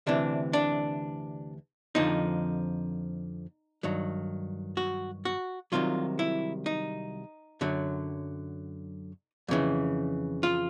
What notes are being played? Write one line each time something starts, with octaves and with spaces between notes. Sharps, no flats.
D2 C3 E3 D4
D4
F2 D3 F3 D#4
G2 D#3 F#3
F#4
F#4
C2 C3 D#3 F#3 F4
E4
D#4
F#2 D3 F#3
F2 C#3 E3
F4